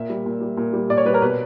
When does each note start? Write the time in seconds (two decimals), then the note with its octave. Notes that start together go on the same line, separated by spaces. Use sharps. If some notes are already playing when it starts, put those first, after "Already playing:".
Already playing: A#2 E5
0.10 G3
0.26 A#2
0.41 G3
0.57 A#2
0.73 G3
0.90 A#2 D5
0.97 C#5
1.05 G3 B4
1.14 A#4
1.22 B2 B4